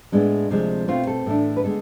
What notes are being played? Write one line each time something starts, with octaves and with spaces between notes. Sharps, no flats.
A2 G#3 B3 D4
D2 C3 F3 G#3 C4
B2 A3 C4 F4
A4
A2 E3 A3 D4
B4
D3 G#3 B3 D4 A4